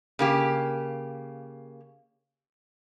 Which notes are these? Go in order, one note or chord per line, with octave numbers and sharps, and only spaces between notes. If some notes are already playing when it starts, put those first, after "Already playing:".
C#3 A#3 G4